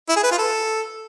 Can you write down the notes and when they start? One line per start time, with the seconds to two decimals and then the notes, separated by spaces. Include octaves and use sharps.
0.09 E4
0.16 G#4
0.24 B4
0.31 F4
0.38 A4